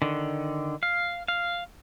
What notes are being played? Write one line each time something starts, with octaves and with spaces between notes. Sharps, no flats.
D3 D#3
F5
F5